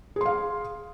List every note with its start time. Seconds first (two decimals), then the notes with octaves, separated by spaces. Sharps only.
0.16 G#4
0.21 C6
0.26 F5